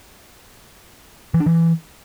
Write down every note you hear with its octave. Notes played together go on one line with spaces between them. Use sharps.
E3
D4
E3